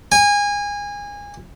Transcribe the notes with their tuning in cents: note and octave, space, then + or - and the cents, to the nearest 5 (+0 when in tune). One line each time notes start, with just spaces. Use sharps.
G#5 -25